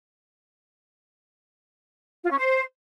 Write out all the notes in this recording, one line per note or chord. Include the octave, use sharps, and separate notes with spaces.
F4
C#4
C5